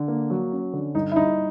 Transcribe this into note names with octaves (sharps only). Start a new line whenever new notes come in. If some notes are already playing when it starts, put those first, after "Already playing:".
Already playing: D3
A#3
F#3
C#4
D3
G2 D#4
E4
G2 D#4